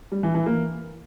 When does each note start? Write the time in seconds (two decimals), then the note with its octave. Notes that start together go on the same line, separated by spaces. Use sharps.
0.12 G3
0.23 E3
0.35 E3
0.46 A#3